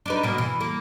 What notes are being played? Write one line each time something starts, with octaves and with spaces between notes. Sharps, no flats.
D4 D#4 B4
B2 A#3
E3
A#3